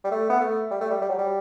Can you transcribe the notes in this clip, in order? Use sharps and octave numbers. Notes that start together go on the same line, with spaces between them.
G3
A3
B3
A3
G3
A3
G3
G3
F#3
G3